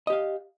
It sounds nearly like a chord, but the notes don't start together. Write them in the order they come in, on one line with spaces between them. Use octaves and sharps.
D#5 G4 F5